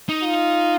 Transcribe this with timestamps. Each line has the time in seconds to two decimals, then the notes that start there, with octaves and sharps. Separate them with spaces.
0.09 D#4
0.23 F4